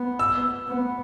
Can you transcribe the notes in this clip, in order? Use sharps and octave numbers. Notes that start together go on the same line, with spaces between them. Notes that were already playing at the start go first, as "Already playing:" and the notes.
Already playing: B3
E6
B3